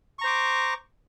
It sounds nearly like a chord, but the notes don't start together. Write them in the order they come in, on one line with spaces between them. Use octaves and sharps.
C#6 A#5 C5 D6